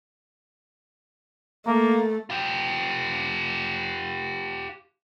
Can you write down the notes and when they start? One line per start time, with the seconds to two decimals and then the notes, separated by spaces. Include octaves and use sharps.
1.67 A3 A#3
2.30 F4 G4